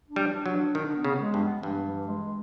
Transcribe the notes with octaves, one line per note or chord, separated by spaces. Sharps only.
D4
G3
D4
F#3
D4
D#3 D4
B3
C#3
G#3
G2
B3
G2 E3
E3
G#3